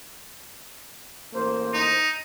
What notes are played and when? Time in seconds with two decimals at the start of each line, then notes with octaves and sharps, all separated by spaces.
1.34 A1 A#3 C5
1.74 D#4